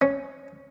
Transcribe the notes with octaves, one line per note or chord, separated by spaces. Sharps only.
C#4